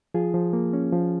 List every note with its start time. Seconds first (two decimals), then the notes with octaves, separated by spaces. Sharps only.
0.14 F3 F4 G#4
0.34 F3
0.53 A#3
0.73 C#4
0.92 F3